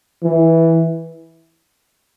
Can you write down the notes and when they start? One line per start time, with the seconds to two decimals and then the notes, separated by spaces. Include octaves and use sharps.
0.23 E3